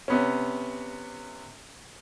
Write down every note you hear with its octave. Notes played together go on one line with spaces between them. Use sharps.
C3 B3 C#4